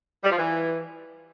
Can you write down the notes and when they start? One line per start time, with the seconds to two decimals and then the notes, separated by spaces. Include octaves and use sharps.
0.23 G3
0.31 F3
0.38 E3